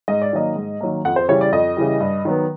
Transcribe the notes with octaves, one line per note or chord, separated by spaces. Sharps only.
G#2 D#5
D5
D#3 F#3 A#3 D#5
G#2
D#3 F#3 A#3
F2 F#5
C5
C#3 E3 G3 C#5
D5
F2 D#5
C#3 E3 G3
G2
D#3 F#3 B3